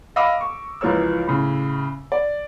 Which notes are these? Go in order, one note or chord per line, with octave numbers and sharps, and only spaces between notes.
D#5 F5 B5 D6 E6
C#6
C#2 E3 F3 A#4 C#5 E6
A2 C#3
D5